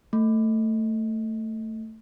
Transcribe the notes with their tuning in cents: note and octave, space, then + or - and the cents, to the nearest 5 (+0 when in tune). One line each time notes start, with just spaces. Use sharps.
A3 +15